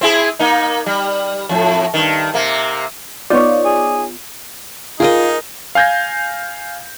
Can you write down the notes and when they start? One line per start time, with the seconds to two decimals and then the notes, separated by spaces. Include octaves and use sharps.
0.01 C4 E4 G#4
0.39 A#3 D#4
0.86 G3
1.49 F2 A2
1.94 G2 D#3
2.34 C3 A#3
3.30 B3 D#4 F4 C#5 D5
3.65 G#4
5.00 D#4 F4 G#4 A#4 D#5
5.75 F5 G#5 G6 G#6 A#6